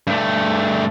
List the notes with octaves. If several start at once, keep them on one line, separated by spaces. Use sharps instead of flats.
G2 A3